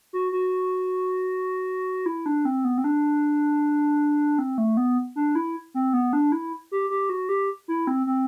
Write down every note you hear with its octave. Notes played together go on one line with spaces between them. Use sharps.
F#4
F#4
E4
D4
C4
B3
C4
D4
C4
A3
B3
D4
E4
C4
B3
D4
E4
G4
G4
F#4
G4
E4
C4
C4